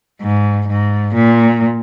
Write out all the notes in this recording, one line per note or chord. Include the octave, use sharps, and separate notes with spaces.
G#2
G#2
A#2